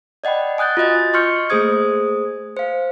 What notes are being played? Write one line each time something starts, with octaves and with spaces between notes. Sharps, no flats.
D5 D#5 F#5 G5 B5
G#5 D#6 F#6 G6 A6
F4 F#4 D#5 A6
D#5 C6 C#6 F6 G6 C#7
A3 A#3 G#4 C5 D#6 G#6
C5 F5